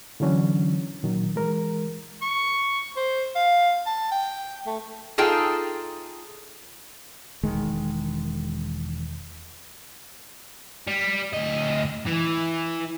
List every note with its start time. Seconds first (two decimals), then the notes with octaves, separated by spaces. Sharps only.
0.20 D3 E3 F#3 C#4 D4
1.03 A#2 D#3 F#3
1.35 E3 G#3 A#4
2.22 C#6
2.96 C5
3.35 F5
3.86 A5
4.12 G5
4.66 A3
5.18 D#4 F4 G#4 A4 G5
7.43 E1 D#3 G#3
10.88 G3
11.34 D2 D#5
12.06 E3